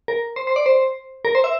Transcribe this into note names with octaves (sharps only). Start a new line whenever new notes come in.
A#4
C5
C5
D5
C5
A#4
C5
E5